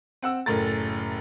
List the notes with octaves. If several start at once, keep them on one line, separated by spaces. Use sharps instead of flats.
C4 F#5 E6
F#1 A2 A#4 A6